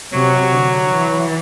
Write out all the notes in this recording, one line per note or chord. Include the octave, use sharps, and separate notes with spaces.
C3 F#3
D3
E3